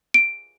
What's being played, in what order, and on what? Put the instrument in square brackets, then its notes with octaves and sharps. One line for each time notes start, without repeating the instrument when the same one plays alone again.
[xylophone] D7